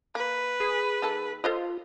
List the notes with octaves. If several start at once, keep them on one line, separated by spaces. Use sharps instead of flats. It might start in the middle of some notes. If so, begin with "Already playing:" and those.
A#3 B4
G#4
D#3 A#3 A4
F4 A4 C5 D#5